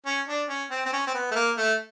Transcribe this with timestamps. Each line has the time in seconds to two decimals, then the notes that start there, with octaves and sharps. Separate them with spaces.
0.06 C#4
0.28 D4
0.49 C#4
0.71 C4
0.86 C4
0.93 C#4
1.07 C4
1.14 B3
1.31 A3
1.35 A#3
1.57 A3